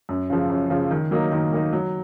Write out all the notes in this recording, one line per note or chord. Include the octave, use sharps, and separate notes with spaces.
F#2
C#3 F3
F#2
C#3 F3
D#3
F#3 A#3 D#4
D#3
F#3 A#3 D#4
F#3